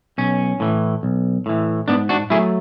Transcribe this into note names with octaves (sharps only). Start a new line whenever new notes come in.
B1 C#4
A2 E3
B1
A2 E3
G#2 B3 D4
D4 F#4
F#3 A3 E4 G#4